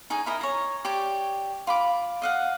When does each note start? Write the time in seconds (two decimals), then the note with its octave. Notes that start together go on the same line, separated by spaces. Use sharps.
0.10 D#4 G#4 C#5 G#5
0.26 E4 A#4 D#5
0.41 C#5 A#5
0.85 G4 C#5 D5
1.67 F4 B5 D6
2.22 D#5 F5 F#5